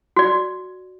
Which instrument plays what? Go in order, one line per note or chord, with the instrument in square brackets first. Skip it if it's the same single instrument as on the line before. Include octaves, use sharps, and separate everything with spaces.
[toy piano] F#4 D5